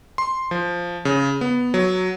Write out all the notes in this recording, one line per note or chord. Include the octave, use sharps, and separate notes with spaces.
C6
F3
C#3
B3
F#3